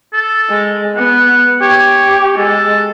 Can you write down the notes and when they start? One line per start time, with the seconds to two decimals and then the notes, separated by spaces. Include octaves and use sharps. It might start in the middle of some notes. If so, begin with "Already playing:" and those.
0.13 A4
0.50 G#3
0.96 B3 F#5
1.61 G4 C#5
2.38 G#3 A4